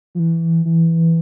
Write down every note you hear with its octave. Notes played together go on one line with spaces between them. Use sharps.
F3
E3
E3